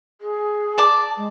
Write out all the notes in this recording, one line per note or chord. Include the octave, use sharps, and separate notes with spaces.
G#4
D5 A5 D6
G#3